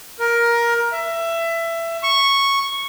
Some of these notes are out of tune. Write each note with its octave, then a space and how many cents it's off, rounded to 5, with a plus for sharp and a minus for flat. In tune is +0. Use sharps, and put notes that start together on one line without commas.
A#4 +15
E5 +20
C#6 -5